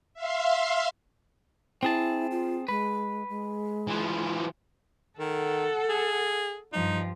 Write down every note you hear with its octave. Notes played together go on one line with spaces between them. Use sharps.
E5 F5 C6
C4 E4 G#4 A5
F4
G#3 B4
G#3
E3 F3
D#3 A4 F#5
G#4
G2 F3 D#4